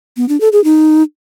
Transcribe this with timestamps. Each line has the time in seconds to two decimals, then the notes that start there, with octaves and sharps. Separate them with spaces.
0.17 B3
0.29 D4
0.41 A4
0.52 G#4
0.64 D#4